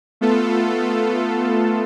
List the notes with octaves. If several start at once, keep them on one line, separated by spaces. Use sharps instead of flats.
A3 B3 F4 A4